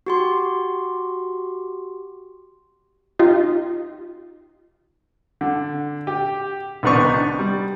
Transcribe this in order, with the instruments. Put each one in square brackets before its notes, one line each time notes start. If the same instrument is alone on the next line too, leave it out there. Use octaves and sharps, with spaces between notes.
[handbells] F#4 G4 C6
[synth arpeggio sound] D#4 F4 G4
[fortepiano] D3
G4
C2 D#3 B3 D4 D#4 C#6
D4
G3